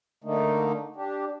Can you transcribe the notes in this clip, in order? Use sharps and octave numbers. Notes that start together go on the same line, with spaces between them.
D3 A3 A#3 D#4
D4 G4